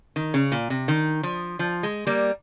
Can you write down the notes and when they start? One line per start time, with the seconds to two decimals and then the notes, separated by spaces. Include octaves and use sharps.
0.16 D#3
0.34 C#3
0.52 A#2
0.70 C3
0.88 D#3
1.23 F3
1.59 F3
1.83 G#3
2.07 G3 A#3